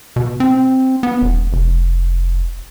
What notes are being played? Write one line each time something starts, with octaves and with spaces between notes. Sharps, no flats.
B2
C4
B3
E1
F1